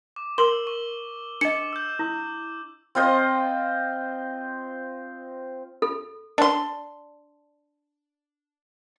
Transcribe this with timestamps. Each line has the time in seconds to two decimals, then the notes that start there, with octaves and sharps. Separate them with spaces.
0.16 D6
0.38 A#4 C6 E6 F#7 G7
0.67 C#6
1.41 D4 D#5 D6 C#7
1.73 E6 G6
1.99 E4 D#6
2.95 C4 F4 C5 D#5
5.82 A4
6.38 D4 C6